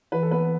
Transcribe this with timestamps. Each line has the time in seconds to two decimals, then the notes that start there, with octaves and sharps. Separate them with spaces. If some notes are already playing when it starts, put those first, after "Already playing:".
0.12 E3 B4
0.23 A4
0.31 B3 B4